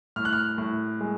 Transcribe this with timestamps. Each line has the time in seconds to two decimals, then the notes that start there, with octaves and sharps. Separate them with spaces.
0.16 A2 F6
0.25 F#6
0.33 F6
0.58 A2
1.00 G#3